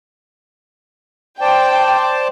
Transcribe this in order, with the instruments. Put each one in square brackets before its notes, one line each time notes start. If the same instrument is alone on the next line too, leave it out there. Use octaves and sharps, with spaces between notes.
[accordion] C5 D5 A5 [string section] G5